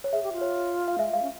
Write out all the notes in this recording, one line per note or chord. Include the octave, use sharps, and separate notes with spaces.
C#5
G#4 E5
G4
F4
C#5
F5
G#3 E5
G#3 F5
C#4